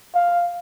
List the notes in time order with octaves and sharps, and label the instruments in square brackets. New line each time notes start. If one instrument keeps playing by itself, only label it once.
[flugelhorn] F5